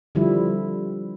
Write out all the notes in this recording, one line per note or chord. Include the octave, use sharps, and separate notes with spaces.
D3 F3 G3 E4